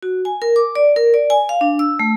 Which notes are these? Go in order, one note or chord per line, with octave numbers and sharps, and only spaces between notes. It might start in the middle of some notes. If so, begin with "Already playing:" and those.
F#4
G#5
A#4
D6
D5
A#4
D5
G#5
F5
D4
E6
A3